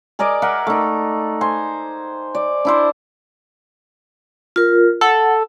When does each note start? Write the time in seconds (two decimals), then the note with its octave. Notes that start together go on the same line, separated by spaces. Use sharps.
0.19 G#4 A#4 D5 D#5
0.42 A#4 E5 F#5
0.67 A3 D#4
1.41 C5 G#5
2.35 D5
2.65 D4 E4 C5
4.56 F4 A#4
5.01 A4 F#5